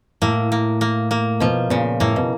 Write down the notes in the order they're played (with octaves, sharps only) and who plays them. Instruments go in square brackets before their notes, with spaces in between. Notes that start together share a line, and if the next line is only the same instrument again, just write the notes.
[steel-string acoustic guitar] A2 [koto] A#3
[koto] A#3
A#3
A#3
[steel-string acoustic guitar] B2 [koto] F3
[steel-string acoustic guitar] A#2 [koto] C#3
[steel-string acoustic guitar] A2 [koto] A#3
[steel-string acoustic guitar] B2